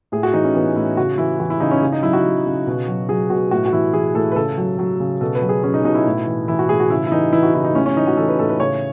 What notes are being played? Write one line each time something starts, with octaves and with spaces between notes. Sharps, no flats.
A2 G#4
F#4
E3 D#4
C#4
E3 B3
A2 E4
C#3 F#4
E3 E4
E3 F#4
E4
C#3 D#4
C#4
C#3
D#4
F#3 E4
F#4
F#3
C#3
B2
F#3
F#3 G#4
B2 F#4
A2 F#4
F#4
E3 E4
E3 G#4
A2 A4
B4
C#3 A4
F#3
F#3
C#3
B2 A4
B4
F#3
G#4
F#3 C#4
D#4
B2 D#4
E4
A2
E3
E3 E4
F#4
A2 G#4
F#4
C#3 E4
E4
E3 D#4
E3 E4
F#4
C#3 E4
D#4
A2 C#4
C#4
E3 D#4
F#4
E3 A4
B4
A2 A4
B4
C#3 C#5